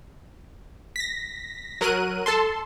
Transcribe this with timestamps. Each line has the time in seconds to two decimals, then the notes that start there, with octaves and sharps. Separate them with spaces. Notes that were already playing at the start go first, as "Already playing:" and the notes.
0.96 A#6 B6
1.81 F#3 A#4 F#6 D#7
2.26 A4 A5 C6